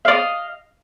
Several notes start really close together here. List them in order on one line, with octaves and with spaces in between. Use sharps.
F5 D5 D#5